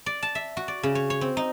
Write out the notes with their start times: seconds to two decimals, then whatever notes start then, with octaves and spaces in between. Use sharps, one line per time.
0.06 D5
0.23 A5
0.35 E5
0.57 F#4
0.68 D5
0.83 C#3
0.95 C#5
1.10 C#5
1.21 C4
1.37 D#4